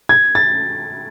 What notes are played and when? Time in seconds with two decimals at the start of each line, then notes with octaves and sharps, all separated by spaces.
0.09 G#6
0.35 A6